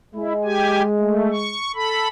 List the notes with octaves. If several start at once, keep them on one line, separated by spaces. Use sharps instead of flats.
G#3 E4
G4 G#5
A3
C#6
A4 B5